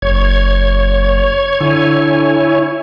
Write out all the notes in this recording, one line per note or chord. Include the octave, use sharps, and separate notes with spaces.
F#1 C#5 G#6
D3 E4 C#5 G#5